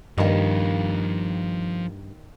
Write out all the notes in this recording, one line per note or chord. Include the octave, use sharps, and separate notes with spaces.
G2 D#3 F3 A#3 D#5